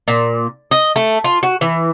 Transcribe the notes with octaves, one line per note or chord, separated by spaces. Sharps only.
A#2
D#5
A3
F4
F#4
E3